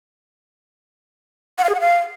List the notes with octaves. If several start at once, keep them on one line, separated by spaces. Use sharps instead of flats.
F#5
F5
G#4
F#5
F5